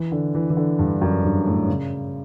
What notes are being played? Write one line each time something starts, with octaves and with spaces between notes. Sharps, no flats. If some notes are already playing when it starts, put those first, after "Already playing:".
Already playing: E3
D3
E3
E3
D3
G2
F#2
G2
A2
C#3